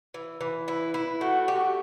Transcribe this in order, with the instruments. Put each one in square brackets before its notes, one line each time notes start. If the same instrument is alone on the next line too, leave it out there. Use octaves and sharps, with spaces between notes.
[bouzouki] E3
E3
[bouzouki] E4 [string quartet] B4
[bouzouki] E4
[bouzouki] A3 [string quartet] F#4
[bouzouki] G4